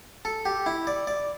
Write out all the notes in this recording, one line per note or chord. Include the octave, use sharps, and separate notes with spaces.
A4
G4
E4
D5
D5